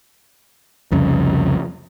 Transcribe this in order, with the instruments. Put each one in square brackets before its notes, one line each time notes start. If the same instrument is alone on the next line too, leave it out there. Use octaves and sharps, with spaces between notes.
[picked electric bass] C2 F2 C#3